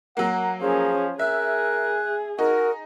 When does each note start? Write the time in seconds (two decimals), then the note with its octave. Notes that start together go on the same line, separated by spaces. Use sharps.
0.17 F#3 A#3 F#5
0.61 F3 C#4 G#4
1.19 G#4 A#4 E5 F#6
2.39 D#4 F#4 A#4